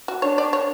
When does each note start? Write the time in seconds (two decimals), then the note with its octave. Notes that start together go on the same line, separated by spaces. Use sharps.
0.08 F#4
0.22 D4 C#5
0.38 D5
0.53 C#5